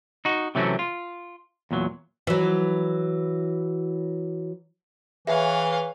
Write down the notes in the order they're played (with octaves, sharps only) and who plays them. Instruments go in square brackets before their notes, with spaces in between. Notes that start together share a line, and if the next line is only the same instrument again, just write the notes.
[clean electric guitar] D#4 F#4
C3 E3 F#3 A3 C4 C#4
F4
E2 A#2 F#3
[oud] E3 F#3
[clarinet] E3 [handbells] G#4 B4 G#5 [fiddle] C#5 F5 [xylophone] E5